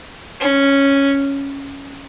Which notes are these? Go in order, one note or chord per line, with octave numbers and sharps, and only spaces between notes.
C#4